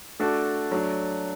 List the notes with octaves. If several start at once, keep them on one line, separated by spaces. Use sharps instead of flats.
A3 D4 F#4 A4 D5
F#3 A3 D4